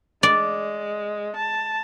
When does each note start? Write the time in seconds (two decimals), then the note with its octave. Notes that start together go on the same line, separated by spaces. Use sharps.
0.23 G#3 D5
1.36 A5